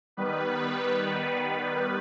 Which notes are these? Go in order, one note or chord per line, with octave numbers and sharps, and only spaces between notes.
D#3 G3 B3 B4